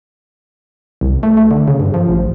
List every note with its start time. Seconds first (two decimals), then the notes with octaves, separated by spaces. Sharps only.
1.01 C2
1.23 A3
1.37 A3
1.51 D3
1.68 C#3
1.80 G2
1.94 F3
2.09 A1